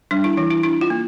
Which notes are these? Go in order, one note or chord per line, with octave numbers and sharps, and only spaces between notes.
G3 D4
E4
E3 E4
E4
D4 E4
F4
A#3